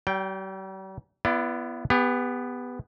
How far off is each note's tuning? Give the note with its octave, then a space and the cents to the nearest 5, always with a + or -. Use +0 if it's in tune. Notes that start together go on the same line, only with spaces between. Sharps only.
G3 -45 G5 +0
B3 +0 E4 +40 D5 +0
B3 +5 G4 +40